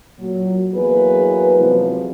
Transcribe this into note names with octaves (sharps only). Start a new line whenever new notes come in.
A#2 F#3
E2 F#3 A#3 G#4 B4
E2 C3 F3 F#3 G#3